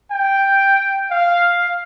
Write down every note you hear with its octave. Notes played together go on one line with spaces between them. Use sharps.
G5
F5